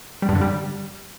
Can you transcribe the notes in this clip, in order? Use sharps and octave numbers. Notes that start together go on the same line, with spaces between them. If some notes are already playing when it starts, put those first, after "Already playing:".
G3
G2
D3
G3